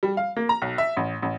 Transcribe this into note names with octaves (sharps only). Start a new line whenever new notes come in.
G3
F5
A#3
A#5
B1
E5
A1
A1